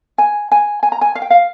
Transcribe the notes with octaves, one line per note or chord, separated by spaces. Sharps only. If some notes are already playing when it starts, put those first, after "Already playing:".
G#5
G#5
G#5
A#5
G#5
F5
G5
F5